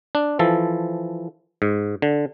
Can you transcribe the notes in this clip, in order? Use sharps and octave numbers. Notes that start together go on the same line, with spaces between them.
D4
E3 F3 A4
G#2
D3